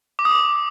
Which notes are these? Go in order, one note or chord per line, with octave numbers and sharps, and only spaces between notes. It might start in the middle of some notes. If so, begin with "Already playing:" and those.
D6
D#6
D6